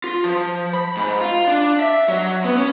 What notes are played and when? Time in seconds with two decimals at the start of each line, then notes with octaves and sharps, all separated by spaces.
0.04 F4
0.24 F3
0.73 B5
0.97 G#2
1.21 F4
1.47 D4
1.80 E5
2.08 F#3
2.44 B3
2.57 C#4